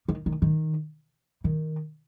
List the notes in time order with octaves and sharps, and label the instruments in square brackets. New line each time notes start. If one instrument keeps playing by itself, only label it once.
[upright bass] D#3
D#3
D#3
D#3